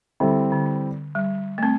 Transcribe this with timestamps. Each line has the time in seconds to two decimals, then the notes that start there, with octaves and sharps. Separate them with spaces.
0.20 D3 G3 C4 E4 A4 C5
0.52 D3
1.15 G3
1.58 A3
1.63 C4